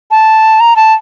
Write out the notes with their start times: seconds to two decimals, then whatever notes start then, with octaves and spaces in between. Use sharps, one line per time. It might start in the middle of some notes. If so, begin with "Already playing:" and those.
0.11 A5
0.60 A#5
0.76 A5